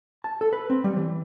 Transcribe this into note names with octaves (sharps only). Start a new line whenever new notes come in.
A5
A4
B4
C4
G3
E3